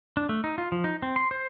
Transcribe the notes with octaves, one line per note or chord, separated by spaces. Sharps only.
D4
A3
D#4
F4
F3
D#4
C4
C6
C5